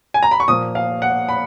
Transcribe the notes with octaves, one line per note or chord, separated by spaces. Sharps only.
G#5
A#5
B5
C#6
A#2 F3 A#3 D#6
F5
F#5
B5